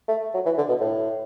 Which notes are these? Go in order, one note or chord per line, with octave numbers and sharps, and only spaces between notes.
A3
F#3
E3
D3
B2
A2